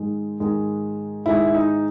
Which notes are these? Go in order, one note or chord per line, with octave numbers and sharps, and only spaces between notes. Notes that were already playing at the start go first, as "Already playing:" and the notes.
Already playing: G#2 D#3 G#3
G#2 D#3 G#3
G#2 D#3 G#3 E4
D#4